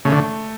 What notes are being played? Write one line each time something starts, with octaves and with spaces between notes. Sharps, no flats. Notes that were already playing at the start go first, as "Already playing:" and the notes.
C#3 A3
D3